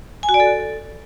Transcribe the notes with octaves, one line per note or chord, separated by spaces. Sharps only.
G#5
F#4
D5
A4